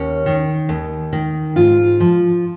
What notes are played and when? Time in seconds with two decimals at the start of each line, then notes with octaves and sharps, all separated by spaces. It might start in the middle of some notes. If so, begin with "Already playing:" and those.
Already playing: D#2 C#4
0.26 D#3
0.69 D#2
1.13 D#3
1.56 G#2 F4
2.00 F3